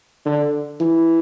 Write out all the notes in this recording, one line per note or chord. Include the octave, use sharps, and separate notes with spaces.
D3
E3